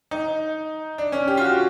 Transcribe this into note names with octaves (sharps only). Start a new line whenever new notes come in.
D#4
D4
C#4
G4
F4
F#4